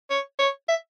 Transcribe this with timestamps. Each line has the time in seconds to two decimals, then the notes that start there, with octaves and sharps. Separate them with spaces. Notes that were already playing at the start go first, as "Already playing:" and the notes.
0.10 C#5
0.39 C#5
0.68 E5